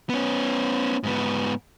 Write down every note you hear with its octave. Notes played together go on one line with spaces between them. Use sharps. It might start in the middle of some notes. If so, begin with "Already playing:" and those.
B3 C#4
G#2 B3